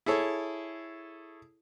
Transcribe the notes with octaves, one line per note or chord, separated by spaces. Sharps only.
E4 G#4 A4 C#5